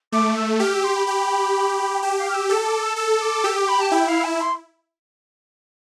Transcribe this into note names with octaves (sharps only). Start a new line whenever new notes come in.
A3 D6
E6
G4 F6
E6
C6
B5
G4
G4 A5
F5
F6
E6
A4 E6
D6
E6
A4 E6
D6
G4 E6
D6
B5
A5
E4 G5
F5
A5
C6